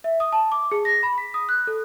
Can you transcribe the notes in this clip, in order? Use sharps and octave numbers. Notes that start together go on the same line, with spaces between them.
E5
D#6
A5
D6
G#4
A#6
B5
B6
D#6
F#6
A4